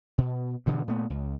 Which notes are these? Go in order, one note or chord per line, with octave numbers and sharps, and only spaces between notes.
B2
G2 B2 D3 E3
A#2 A3 B3
C#2